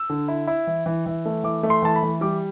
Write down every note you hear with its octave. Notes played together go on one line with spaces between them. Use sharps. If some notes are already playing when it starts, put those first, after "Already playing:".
Already playing: E6
D3
E4
E4
E3
E3
E3
A3
E3 D6
A3
C6
E3 A5
B5
E3
G3 D6